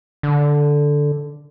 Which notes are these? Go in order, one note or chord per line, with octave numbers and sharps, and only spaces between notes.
D3